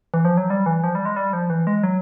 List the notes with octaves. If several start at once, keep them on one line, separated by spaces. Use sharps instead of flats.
E3
F3
F#3
G3
E3
F3
G3
G#3
G3
F3
E3
G#3
F#3